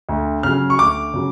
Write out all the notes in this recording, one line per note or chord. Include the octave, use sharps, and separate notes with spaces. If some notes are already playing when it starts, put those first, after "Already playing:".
D2
C#3 F#3 F6
C#6
D2 D6
C#3 F#3